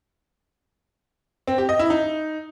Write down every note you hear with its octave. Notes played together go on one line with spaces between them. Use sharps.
C4
G4
D#5
E4
D#4